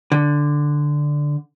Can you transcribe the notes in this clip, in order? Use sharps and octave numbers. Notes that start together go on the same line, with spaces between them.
D3